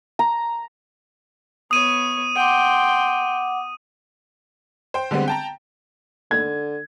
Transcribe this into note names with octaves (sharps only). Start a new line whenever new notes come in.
A#5
B3 C#5 D#6 D#7
F#5 G5 C6 D6
C5 G5
D3 G3 G#3 B3 C4
G5 A5 A#5
D3 G#6